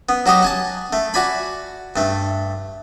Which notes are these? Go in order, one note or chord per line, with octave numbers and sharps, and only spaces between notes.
B3
F#3 F#4 G4 D#5
F#5 G#5 A5
A3
F#4 D5 G#5 B5
G2 A3